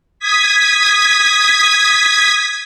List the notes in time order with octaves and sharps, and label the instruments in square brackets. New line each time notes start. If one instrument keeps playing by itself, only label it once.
[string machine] D#6 G#6 B6